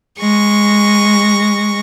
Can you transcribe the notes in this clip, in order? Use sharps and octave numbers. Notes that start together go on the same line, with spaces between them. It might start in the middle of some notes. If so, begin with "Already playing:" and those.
G#3 C#6 A#6